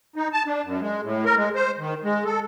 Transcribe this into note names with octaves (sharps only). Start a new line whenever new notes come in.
D#4
A5
D4
F#2
G#3
A2
A#4
G#3
C5
D#3
G#3
A4